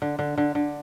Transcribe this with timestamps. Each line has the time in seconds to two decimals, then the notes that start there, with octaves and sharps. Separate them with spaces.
0.02 D3
0.19 D3
0.38 D3
0.55 D3